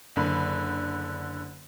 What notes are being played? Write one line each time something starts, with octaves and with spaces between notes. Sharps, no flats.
F#1 D3 B5